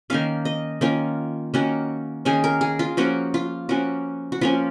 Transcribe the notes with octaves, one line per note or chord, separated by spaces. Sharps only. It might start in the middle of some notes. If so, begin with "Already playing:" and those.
D#3 A#3 C#4 F5
D#5
D#3 A#3 C#4 F4
D#3 A#3 C#4 F#4
D#3 A#3 C#4 G#4
A#4
G#4
F4
F3 A#3 C#4 F#4
F4
F3 A#3 C#4 F#4
F#4
F3 A#3 C#4 F4